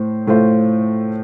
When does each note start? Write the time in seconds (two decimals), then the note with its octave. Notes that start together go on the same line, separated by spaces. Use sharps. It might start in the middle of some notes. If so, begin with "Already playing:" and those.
Already playing: A2 A3 C5
0.27 A2 A3 F4 C5